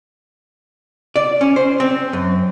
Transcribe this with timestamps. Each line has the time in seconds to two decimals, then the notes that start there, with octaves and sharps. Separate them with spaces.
1.16 D5
1.41 C#4
1.56 C5
1.80 C4
2.13 F#2